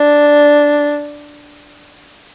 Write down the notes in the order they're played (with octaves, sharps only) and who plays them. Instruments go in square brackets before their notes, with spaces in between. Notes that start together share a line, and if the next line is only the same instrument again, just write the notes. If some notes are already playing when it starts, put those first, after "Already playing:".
Already playing: [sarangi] D4